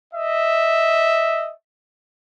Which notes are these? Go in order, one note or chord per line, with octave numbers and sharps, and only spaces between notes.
D#5 E5